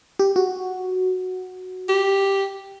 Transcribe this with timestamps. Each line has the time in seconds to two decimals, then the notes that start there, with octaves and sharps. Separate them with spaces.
0.19 G4
0.36 F#4
1.89 G4